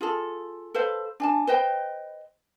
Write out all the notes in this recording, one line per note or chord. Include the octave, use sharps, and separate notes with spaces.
F4 G#4 A4
A4 B4 C5 F5
D4 G#5 A5
B4 C5 D#5 G5